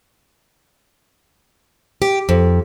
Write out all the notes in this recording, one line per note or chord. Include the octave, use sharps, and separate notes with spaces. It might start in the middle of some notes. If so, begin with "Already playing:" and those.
G4
F2